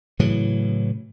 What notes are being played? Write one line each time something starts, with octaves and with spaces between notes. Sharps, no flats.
A2 C#3 E3 F#3